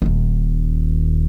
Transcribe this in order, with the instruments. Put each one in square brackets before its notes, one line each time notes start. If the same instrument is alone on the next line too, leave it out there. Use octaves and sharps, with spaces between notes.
[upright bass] D#1 D#2